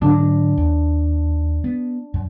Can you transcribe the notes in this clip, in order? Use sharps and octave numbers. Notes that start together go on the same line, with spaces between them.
G#2 D3 F#3 D4
D#2
B3
F#2